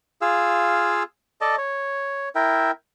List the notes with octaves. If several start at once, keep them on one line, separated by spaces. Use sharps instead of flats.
F4 G#4 F5 E6
A4 D5 D#5 A5
C#5
E4 A#4 E5 G5